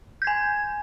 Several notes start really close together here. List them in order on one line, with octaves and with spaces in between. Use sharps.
G6 G#6 G#5